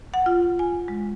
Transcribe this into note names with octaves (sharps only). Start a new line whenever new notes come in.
F#5
F4
G#5
G#3